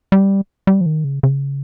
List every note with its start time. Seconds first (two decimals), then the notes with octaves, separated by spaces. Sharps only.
0.12 G3
0.67 G3
0.81 F3
0.86 D#3
1.04 C#3
1.23 C#3